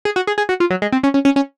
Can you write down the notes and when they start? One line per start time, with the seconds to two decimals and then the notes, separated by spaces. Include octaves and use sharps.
0.05 G#4
0.16 F#4
0.27 G#4
0.38 G#4
0.49 F#4
0.60 F4
0.70 F#3
0.82 G#3
0.92 C4
1.03 C#4
1.14 C#4
1.25 C#4
1.36 C#4